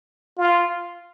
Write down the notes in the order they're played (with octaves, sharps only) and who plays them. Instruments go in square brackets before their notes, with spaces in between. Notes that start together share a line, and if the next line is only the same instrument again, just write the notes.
[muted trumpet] F4